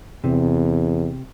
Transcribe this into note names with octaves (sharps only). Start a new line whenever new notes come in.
E2 C3